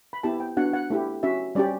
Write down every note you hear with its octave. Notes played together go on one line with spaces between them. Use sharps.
B5
B3 E4 G4 A5
G5
B3 D4 F#4 F#5
F#5
A3 E4 G4
C#4 F#4 E5
G3 C#4 G4 D5